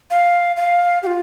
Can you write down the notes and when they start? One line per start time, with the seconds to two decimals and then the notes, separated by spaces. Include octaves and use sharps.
0.10 F5
0.57 F5
1.03 G4
1.07 F4